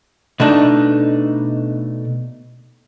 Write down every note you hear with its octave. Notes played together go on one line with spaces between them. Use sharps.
B2 A3 D4 D#4